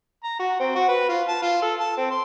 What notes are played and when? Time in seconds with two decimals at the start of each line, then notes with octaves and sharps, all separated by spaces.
0.24 A#5
0.39 F#4
0.60 C4
0.75 F#4
0.88 B4
1.09 F4
1.28 A5
1.43 F4
1.62 A4
1.80 A5
1.97 C4
2.11 C6